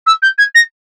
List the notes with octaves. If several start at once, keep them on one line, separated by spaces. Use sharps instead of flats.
E6
G6
G#6
A#6